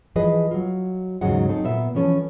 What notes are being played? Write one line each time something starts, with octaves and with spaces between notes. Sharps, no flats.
E3 F3 G#4 B4 D#5
F#3 F4
D#2 G#2 C#3 F#3 G#3 F#5
F#3 C4 D#4 A4
A#2 B3 E5
E3 F3 C#4 A4